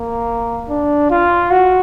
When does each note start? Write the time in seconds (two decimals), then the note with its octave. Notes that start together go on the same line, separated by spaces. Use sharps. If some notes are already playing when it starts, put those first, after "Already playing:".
Already playing: A#3
0.69 D4
1.10 F4
1.51 F#4